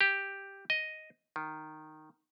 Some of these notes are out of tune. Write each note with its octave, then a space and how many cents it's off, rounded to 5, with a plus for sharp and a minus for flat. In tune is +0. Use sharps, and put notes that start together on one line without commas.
G4 +5
D#5 +0
D#3 -5